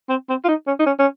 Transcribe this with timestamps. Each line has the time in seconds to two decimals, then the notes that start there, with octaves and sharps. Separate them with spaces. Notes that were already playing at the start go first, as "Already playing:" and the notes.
0.10 C4
0.29 C4
0.44 F4
0.48 D#4
0.67 C#4
0.79 D#4
0.86 C#4
0.99 C#4